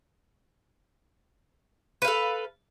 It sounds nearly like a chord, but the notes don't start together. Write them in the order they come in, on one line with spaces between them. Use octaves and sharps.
B4 F5 A4